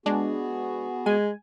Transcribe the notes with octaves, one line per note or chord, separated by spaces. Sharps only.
G#3 B3 D4 F#4 G#4
G#3 G#5